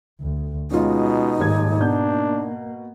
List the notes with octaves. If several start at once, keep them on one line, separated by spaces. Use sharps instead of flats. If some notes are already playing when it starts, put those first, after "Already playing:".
D2
B2 G#3 C#4 D#4 F4
D#1 D#2 G#2 G#6
B2 A#3 D4 G6